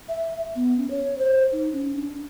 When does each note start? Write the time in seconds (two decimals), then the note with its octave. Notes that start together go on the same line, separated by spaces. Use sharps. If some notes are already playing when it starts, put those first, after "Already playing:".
0.09 E5
0.56 B3
0.77 C#4
0.90 C#5
1.18 C5
1.52 D#4
1.73 C#4
1.97 D4